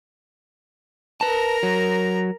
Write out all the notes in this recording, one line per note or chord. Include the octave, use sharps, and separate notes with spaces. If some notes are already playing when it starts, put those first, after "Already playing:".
A#4 B4 A5 A#5
F#3